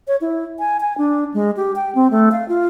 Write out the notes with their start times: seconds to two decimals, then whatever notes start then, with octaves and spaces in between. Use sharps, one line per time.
0.07 C#5
0.21 E4
0.59 G#5
0.80 G#5
0.98 D4
1.34 G#3
1.57 G4
1.76 G5
1.95 C4
2.11 A3
2.32 F5
2.49 F4